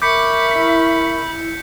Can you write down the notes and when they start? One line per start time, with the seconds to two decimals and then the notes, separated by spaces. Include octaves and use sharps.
0.02 A#4 E5 B5 C#6 D6 G6 B6 C#7
0.56 E4